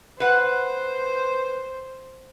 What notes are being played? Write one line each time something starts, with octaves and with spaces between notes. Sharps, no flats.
B4 C5 F#5